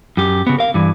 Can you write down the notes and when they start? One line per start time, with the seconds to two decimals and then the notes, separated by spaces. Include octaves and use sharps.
0.17 F#2 G4
0.47 C#3 B3
0.58 A#4 F5
0.74 G2 E3